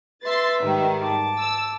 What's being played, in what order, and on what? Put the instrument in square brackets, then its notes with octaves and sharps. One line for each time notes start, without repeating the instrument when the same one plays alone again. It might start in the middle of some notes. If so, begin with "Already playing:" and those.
[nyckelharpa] B4 E5 [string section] C6 A6
[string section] G#2 D#3 G3
[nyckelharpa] A5 D6
[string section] E6